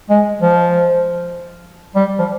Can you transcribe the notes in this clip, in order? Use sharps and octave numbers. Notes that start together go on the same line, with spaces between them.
G#3
F3
G3
F3